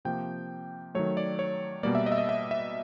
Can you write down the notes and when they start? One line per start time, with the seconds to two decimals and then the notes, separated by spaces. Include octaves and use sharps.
0.05 C3 F3 A#3 G5
0.95 D#3 F#3 A3 C#5
1.17 D5
1.39 C#5
1.83 B2 G3 A#3 D5
1.95 E5
2.06 D#5
2.12 E5
2.18 D#5
2.29 E5
2.51 E5